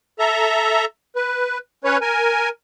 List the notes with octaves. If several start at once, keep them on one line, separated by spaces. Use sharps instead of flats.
A4 E5 A#5
B4
C#4 B4 C#5
A#4 G#5